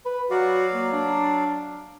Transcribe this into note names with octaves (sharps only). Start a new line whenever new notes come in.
B4
F#3 F#4 D5 F5
A#3
D4